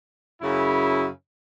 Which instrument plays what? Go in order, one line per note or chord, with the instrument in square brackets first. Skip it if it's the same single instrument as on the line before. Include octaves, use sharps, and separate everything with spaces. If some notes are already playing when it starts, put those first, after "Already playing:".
[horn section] F#2 C#3 E4